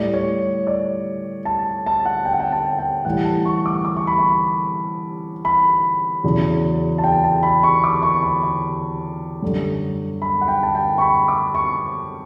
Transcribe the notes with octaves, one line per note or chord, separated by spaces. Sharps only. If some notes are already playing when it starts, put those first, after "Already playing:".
Already playing: A2 G3 D5
C#5
D5
A5
A5
F#5
G5
F#5
G5
A5
G5
A2 E3 G3 F#5
A5
C#6
D6
D6
C#6
B5
C#6
B5
E2 C#3 F#3
A5
G5
A5
B5
C#6
D6
C#6
B5
C#6
F#2 D3 G3
B5
F#5
G5
A5
G5
C#6
B5
D6
C#6